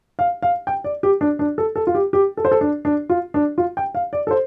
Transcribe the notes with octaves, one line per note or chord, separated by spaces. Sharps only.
F5
F5
G5
D5
G4
D4
D4
A4
A4
F4
G4
G4
A4
C5
A4
D4
D4
F4
D4
F4
G5
F5
D5
A4
C5